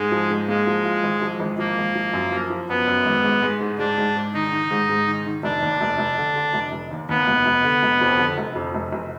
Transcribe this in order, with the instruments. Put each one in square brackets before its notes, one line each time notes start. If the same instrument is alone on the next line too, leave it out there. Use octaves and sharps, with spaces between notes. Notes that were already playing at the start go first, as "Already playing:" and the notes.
Already playing: [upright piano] G#2 [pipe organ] G#3
[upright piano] F3
G#2
[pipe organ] G#3 [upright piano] A#3
[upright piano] F3
F4
G#1
F3
G#1
[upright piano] F3 [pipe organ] A#3
[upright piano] G#1
F3
F#2
F3
F3
[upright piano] F#2 [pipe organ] B3
[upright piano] F#2
G#1
G#2
G#3
G#2
[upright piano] G#2 [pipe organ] D4
[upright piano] G#2
G#2
[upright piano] D#3 [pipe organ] D#4
[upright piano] D#3
G#2
G#2
D#3
D#3
[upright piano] F1 [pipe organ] D4
[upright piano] D#2
F1
F1
D3
D3
F1
F1
D#2
[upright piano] D#2 [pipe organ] B3
[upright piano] F1
F1
D3
F1
F2
D3
F1
F2
F1
F1